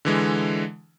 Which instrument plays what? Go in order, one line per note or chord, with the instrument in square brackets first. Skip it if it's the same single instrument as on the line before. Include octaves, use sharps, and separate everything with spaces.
[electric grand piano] D3 E3 G#3